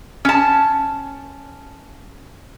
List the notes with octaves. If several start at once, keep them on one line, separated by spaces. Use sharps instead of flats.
C#4 A5